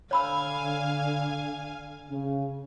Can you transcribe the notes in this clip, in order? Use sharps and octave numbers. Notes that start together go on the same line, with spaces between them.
D3 C#5 F5 G#5 B5 E6
C#3